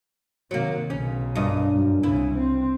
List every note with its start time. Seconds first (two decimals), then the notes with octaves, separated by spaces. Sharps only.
0.51 C3 D#3 F#3 A#3
0.90 B1 C#3 C#4
1.35 G2 A#2 D#5
1.72 F#2
2.03 C2 C#3 E4
2.34 C4